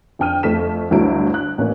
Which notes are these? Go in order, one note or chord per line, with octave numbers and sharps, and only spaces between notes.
F2 D4 G5 F6 D#7
F2 A3 B6 E7
G1 D2 F#3 E4 D7
F#6
A1 A#3 C#4